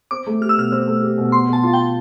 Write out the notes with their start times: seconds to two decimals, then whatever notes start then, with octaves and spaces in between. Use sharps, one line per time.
0.11 C4 D6
0.27 A3
0.41 G4 F6
0.49 E6
0.57 B2 F6
0.72 C4 E6
0.88 A3
1.03 G4
1.18 B2
1.32 B3 C6
1.49 B2 A5
1.63 F4
1.73 G5